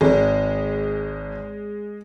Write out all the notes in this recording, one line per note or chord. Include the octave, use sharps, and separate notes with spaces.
G#1 G#3